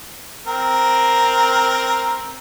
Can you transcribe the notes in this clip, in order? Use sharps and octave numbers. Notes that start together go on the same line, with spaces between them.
C4 A#4